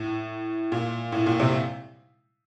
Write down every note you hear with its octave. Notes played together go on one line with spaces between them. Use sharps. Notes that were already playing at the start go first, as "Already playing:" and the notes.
Already playing: A2
A#2
A2
A#2
C3